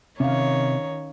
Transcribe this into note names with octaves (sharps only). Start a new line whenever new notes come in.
C3 D#3 C#4 C#5 F5